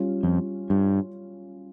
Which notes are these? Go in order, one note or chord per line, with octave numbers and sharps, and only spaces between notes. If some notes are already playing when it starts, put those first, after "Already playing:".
Already playing: G3 C#4 F4
F2
G2